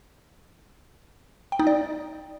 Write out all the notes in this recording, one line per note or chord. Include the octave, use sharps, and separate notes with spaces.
G5
D#4
D5